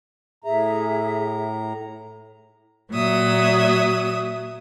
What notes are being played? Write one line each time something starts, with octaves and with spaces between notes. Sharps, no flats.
A2 G#4 E5 A#5
A#2 F#3 E5 D#6